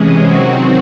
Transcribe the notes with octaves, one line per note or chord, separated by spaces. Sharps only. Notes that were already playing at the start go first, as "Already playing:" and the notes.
Already playing: C3 E3 G#3 C#4 G#4
D#3 F#3 C4 F#4